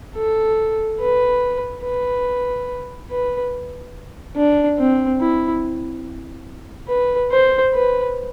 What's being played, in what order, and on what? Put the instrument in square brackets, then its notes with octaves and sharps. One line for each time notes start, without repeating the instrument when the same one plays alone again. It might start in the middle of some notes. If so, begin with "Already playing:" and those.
[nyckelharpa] A4
B4
B4
B4
D4
C4
E4
B4
C5
B4